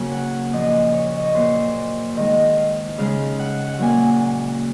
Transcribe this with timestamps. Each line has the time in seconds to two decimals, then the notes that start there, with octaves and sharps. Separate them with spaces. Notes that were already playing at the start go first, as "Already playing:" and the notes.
Already playing: C#3 F#3 A#3 G#5
0.12 F#5
0.53 A#2 F3 A#3 D#5
0.93 C#5
1.17 D#5
1.25 C#5
1.35 A#2 F#3 A#3 C5
2.17 D#3 G#3 D#5
2.57 F5
2.98 C#3 G#3 F5
3.39 F#5
3.67 F#5
3.78 A#2 F#3 A#3 G#5